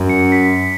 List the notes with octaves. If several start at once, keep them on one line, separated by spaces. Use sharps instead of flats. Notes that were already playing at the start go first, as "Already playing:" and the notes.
Already playing: F#2
C#7
B6